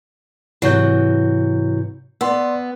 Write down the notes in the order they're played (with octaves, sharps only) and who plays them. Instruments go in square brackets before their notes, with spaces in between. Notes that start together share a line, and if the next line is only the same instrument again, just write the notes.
[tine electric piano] G#2 C3 G6 [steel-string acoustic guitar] E3 F#3
[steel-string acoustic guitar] B3 [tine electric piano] D5 C6 E6